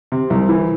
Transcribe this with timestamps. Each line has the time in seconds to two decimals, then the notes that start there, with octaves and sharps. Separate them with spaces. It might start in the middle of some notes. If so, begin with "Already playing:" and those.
0.12 C3
0.30 C2
0.49 E3